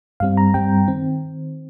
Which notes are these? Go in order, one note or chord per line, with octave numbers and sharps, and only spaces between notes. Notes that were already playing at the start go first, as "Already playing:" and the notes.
G2 G3 C4 F5
A#5
G2 G3 C4 G5
D#3 C4